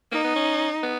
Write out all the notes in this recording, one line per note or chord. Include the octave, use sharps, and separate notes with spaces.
A#3 D#4
B3
C#4
B3